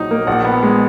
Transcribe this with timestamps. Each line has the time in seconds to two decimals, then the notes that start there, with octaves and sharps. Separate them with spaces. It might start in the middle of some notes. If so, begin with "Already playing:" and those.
Already playing: A#1 F#3 D#4
0.11 A#3
0.27 A#1 F#5
0.45 B3
0.63 G#3